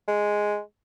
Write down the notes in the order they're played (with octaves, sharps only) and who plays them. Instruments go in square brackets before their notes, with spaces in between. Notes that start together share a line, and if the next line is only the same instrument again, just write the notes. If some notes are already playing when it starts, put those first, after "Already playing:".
[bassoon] G#3